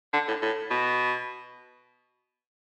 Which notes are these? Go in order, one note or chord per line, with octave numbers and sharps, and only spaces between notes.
D3
A2
A2
B2